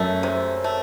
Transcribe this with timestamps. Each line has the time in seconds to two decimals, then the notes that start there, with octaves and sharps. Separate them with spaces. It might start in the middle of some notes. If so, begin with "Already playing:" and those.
Already playing: F#2 A3
0.23 C3
0.64 A3